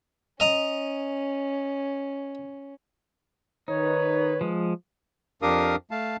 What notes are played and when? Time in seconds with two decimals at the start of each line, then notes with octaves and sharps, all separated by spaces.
0.40 C#4 D#5 A#5 D#6
3.68 D#3 D#4 B4 C#5
4.41 F3 G#3
5.42 F2 D4 G4 A#4 F5 D#6
5.91 A3 F5 A5